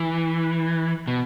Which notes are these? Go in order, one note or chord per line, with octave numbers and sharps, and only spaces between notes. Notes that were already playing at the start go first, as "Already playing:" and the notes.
Already playing: E3
B2